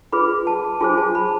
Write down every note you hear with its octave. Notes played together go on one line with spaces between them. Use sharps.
F4 G#4 B4 B5
A5
F4 G#4 C5 G#5
A5
B5